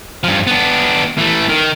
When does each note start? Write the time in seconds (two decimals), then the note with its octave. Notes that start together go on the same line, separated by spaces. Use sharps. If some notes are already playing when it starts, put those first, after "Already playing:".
0.24 G2 F3
0.47 B3 D4
1.18 E3 A3
1.49 D#3